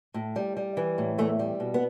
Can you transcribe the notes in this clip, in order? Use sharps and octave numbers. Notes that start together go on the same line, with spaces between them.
A2
G3
G3
E3
A2
E2 A3
G3
B2
B3